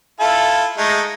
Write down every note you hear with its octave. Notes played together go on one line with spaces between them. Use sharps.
E4 F4 A4
G#3 A3 D#4